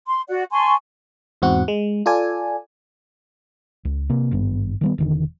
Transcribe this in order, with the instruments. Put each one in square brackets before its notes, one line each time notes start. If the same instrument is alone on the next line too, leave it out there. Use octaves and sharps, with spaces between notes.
[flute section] C6
F#4 D5 F#5
G#5 A5 C6 C#6
[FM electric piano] E2 G#2 C4 F#4 F#5
G#3
F4 A4 D5 G#5
[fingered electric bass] C#2
C3 A#3
G#1 G2 B3
D#3 G3 B3
E1 D3 D#3